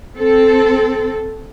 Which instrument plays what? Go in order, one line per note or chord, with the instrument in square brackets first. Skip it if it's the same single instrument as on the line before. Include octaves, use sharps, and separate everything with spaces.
[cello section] C4 A4